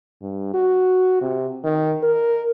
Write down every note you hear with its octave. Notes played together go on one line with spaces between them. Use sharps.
G2
F#4
C3
D#3
A#4